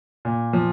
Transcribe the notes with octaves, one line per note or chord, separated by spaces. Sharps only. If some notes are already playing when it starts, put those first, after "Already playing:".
A#2
F3